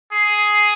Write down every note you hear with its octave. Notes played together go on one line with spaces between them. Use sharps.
G#4